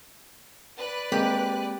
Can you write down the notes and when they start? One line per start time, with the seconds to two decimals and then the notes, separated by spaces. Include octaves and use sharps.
0.77 B4 D5 F#6
1.12 G#3 A#3 C4 G4